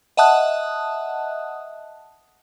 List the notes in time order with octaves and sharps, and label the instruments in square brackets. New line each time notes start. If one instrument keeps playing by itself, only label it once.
[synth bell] D#5 E5 F#5 A5 D#6 F#6